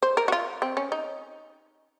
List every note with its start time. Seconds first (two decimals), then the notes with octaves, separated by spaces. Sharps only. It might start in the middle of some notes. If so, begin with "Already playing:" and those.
0.03 C5
0.17 A#4
0.28 F#4
0.32 F4
0.62 C4
0.77 C#4
0.92 D#4